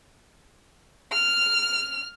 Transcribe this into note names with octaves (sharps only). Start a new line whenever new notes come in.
F6